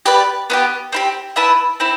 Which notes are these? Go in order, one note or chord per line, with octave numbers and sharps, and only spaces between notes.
G4 B4 D5
B3 E4 G4
C4 E4 G4
E4 B4 E5 A5
C4 E4